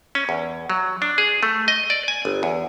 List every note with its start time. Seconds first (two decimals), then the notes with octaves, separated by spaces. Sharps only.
0.15 C#4
0.29 E2
0.70 F#3
1.02 D4
1.18 G#4
1.43 A3
1.68 D#5
1.90 D5
2.08 G#5
2.25 G1
2.43 E2